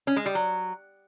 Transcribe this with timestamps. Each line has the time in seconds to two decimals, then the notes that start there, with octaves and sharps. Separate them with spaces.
0.07 C#4
0.16 G#3
0.26 G3
0.35 F#3